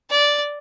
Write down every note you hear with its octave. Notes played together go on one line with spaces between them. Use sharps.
D5